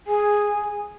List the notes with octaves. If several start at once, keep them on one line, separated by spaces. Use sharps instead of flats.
G#4 G#5